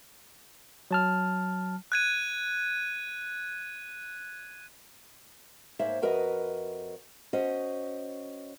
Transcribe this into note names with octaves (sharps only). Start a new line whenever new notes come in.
F#3 A5 F6
F#6 G#6 D#7
G#2 A#3 C5 C#5 E5
F2 F#4 A#4 B4 D#5
C#4 F#4 C5 D#5